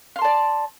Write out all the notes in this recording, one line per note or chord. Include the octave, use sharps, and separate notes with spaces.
D5 F5 A5 C6